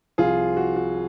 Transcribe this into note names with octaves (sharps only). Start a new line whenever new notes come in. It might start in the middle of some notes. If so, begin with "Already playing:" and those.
C2 C3 F3 F4 G#4
F#4
F#4